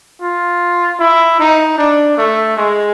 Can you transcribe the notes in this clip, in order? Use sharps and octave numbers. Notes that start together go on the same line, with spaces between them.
F4
E4
D#4
D4
A3
G#3